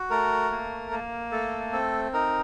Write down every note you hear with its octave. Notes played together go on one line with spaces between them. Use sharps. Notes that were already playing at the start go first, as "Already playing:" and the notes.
Already playing: F#4
A3 A#4
A#3
A#3
A3 A4
C4 A4
D#4 A#4